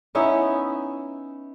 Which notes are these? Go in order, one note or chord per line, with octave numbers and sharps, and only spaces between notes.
B3 C#4 D#4 E4